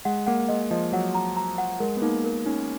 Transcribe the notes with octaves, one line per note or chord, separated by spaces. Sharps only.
G#3 F#5
A#3 F#5
G#3 D#5
F3 D#5
F#3 F#5
A#5
A#5
F#5
G#3 A#4
B3
A#3 D#4
A#4
C#4 D#4